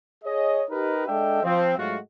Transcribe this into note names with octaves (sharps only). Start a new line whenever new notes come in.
G#4 C#5 D#5
D#4 G4 A#4 B4
G#3 D4 A4 D#5 E5 G5
F3 C4
G#2 F#3 G#3 A3 F4 F#4